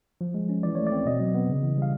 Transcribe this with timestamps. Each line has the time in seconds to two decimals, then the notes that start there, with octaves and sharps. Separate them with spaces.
0.21 F3
0.34 G#3
0.49 C#4
0.63 E3 D5
0.75 A3 C#5
0.87 D5
0.92 C4
1.06 B2 D#5
1.20 F#3
1.35 B3
1.49 C#3
1.63 E3
1.78 G3 F5